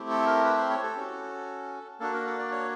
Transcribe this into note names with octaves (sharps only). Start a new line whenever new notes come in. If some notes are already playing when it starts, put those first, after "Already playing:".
Already playing: A3 C4 E4 G4
A4
A#4
B4
C5
C#5
A4
C#4 F#4
A#3 D4 F#4 A4
A#4
A4
D5
C#5